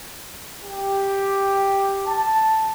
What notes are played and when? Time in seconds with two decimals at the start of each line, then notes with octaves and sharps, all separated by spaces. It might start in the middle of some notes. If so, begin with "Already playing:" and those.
0.63 G4
2.07 A5